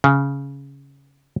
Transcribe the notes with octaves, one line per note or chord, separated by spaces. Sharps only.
C#3